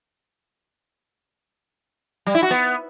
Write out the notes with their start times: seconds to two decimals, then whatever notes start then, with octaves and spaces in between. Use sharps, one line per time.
2.26 G3
2.35 E4
2.43 F#4
2.51 B3